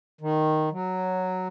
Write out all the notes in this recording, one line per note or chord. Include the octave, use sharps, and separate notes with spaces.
D#3
F#3